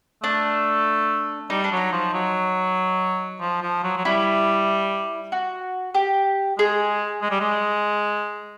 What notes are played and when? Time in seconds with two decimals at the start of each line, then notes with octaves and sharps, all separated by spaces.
0.23 A3 D4
1.50 G3 D#4
1.64 D4
1.72 F#3 D#4
1.92 F3
2.13 F#3
3.41 F3
3.62 F3
3.84 F#3
3.97 F#3
4.05 G3 E4
5.32 F#4
5.95 G4
6.58 G#3 G#4
7.22 G#3
7.31 G3
7.40 G#3